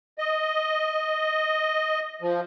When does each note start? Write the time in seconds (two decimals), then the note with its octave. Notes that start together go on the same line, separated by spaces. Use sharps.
0.18 D#5
2.21 F3